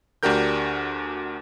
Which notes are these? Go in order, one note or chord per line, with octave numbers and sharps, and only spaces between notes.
D2 D4 F#4 G4 A#4 G6